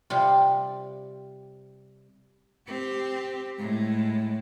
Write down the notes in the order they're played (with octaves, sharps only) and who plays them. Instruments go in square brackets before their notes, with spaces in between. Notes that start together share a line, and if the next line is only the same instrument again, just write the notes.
[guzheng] C3 G3 C4 F4
[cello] C4 G4
A2 G#3